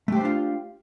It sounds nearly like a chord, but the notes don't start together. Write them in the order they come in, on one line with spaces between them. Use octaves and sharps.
A3 G4 C5 D4 F4